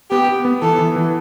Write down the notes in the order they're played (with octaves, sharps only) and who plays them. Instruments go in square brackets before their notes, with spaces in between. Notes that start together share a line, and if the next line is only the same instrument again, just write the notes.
[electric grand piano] B3 [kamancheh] G4
[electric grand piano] B3
B3
[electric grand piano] E3 [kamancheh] A4
[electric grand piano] E3
E3